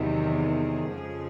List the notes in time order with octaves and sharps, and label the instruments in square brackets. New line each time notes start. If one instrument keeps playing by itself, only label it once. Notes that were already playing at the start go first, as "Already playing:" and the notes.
Already playing: [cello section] E2 C3 D#3 F#3
G#4
F2 C#3 F3 G#3